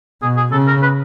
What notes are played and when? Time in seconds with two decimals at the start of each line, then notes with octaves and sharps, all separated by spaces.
0.22 B2 G#4
0.37 G#4
0.52 C#3 A4
0.67 A#4
0.82 B4